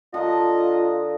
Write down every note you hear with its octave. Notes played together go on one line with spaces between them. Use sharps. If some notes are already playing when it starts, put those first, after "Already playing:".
D3 F4 A#4 D#5